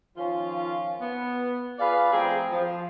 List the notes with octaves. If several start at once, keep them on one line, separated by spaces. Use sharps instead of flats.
D#3 F3 C#4 F4
B3
F4 G#4 B4 D5 F5
A2 F3 C4 G#4 G5 A#5
F3